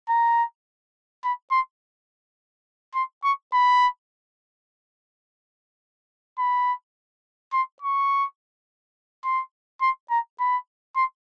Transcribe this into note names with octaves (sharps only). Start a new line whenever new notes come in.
A#5
B5
C6
C6
C#6
B5
B5
C6
C#6
C6
C6
A#5
B5
C6